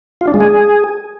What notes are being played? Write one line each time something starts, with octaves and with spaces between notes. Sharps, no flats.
F4
D4
G#3
G#4